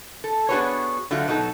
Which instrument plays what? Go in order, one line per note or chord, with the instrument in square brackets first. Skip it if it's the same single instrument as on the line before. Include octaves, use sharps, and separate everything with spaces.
[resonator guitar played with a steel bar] A4
B3 D4 F#4 G#4 B4 C#5
D3 F#3 A3 F4 F#4
B2 F#3 D#4 A4